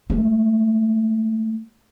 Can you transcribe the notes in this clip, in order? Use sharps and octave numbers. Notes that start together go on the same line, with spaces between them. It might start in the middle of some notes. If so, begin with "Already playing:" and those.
G#3 A3